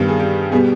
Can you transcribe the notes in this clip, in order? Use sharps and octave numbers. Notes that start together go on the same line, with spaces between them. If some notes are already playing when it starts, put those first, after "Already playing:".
Already playing: G2 D#3 G3 B3
G#4
G4
B2 G3 B3 G#4